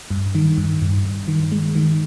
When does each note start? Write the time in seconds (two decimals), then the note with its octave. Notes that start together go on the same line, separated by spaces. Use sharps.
0.11 G2
0.35 D#3
0.58 G2
0.82 G2
1.05 G2
1.28 D#3
1.52 G#3
1.75 D#3